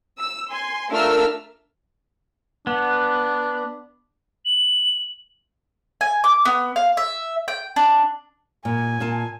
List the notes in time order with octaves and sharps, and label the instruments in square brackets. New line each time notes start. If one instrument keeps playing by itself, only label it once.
[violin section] E6
G#5 C6
A3 D4 F4 A#4 E6 F6
[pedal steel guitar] B3 [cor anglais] D4
[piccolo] F#7
[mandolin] G#5
D6
B3
F5
E5
G5
D4
[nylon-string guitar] A#2 [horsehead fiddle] G#5
[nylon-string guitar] A#2 F4 A5